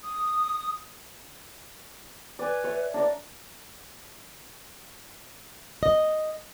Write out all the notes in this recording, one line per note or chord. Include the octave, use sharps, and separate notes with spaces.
D#6
B4 D5 G#5
C#5 E5
D4 A#4 D5
D#5